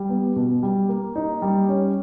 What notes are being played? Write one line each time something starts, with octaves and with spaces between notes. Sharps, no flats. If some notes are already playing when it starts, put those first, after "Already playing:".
Already playing: G3
B3
B2
G3
A#3
D#4
G3
C#4